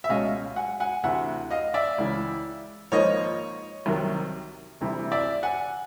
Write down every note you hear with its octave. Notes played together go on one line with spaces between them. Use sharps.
E5
C#2 B2 G#3 C#4 D#5 F5
F#5 G#5
F#5 G#5
D2 C3 E3 E5 F#5
D#5 F5
D5 E5
C#2 C#3 E3
G#1 G#2 F3 A#3 C#5 D#5
C2 C3 D#3 F#3
D2 C3 E3 G3
D5 E5
F#5 G#5